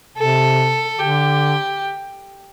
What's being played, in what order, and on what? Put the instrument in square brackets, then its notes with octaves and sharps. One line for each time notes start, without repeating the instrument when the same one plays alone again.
[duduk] C3 [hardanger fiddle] A4
[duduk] D3 [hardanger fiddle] G4